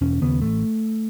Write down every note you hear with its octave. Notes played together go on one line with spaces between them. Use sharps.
E1 C#4
D#2 C#3 B3
A1 A3